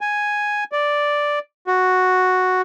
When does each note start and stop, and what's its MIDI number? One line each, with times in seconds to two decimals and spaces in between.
0.01 0.64 80
0.72 1.39 74
1.67 2.62 66